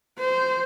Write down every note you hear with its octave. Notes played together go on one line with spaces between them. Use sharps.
C5